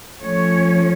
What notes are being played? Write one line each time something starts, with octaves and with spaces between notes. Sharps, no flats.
F3 A3 C#4 C#5